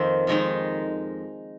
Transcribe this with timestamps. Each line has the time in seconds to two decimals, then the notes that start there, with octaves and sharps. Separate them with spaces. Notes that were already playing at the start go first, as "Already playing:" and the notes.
Already playing: F2 D#3 A#3 C4 D#4
0.27 F2 D#3 G#3 C4 D#4